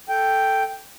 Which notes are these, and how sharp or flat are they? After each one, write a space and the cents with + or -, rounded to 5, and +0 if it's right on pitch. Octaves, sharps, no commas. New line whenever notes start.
A4 +0 G5 +0